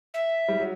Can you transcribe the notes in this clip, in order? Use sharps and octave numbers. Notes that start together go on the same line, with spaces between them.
E5
G3
F#3